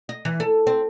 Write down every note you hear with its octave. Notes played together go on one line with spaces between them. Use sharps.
D#5
E3
A4
C4